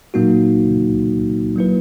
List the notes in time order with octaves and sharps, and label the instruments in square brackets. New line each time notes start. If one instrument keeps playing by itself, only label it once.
[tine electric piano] A#2 F#3 A#3 D#4 F#4
F#3 A#3 E4 B4